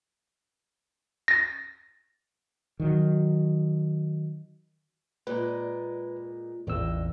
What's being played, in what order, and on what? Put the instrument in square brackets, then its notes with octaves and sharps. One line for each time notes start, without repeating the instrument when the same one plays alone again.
[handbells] A6 A#6
[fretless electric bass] D#3 F#3
[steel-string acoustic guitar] A#2 G#3 [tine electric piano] B4
[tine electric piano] A1 E2 E6 [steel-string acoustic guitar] G2 G#3